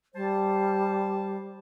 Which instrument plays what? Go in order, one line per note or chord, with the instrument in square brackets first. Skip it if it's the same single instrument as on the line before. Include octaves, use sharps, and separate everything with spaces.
[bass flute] G3 [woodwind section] C5 A5